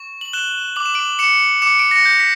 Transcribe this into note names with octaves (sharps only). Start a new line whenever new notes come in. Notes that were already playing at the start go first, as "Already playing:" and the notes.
Already playing: C#6
F#7
F#6 E7 G7
D6 F#7
E7
D7 F#7
D6 C#7 E7
D6 C#7 E7
D7
A#6 C#7
G6
B6